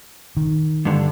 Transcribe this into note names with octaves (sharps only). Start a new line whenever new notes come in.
D#3
G2 D3